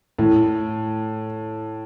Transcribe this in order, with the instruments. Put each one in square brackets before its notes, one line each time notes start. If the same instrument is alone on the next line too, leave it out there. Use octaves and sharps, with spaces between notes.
[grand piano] A2